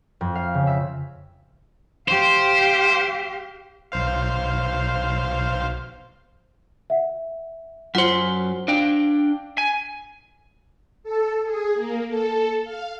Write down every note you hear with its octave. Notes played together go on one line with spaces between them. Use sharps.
F2
F5
C#3
E5
G4 C5 F5
B1 C5 F5
E5 F#5
F#2 F4 C5 F#5 C6
D4 F5 G5
G#5
A4
G#4
A#3
A4
F5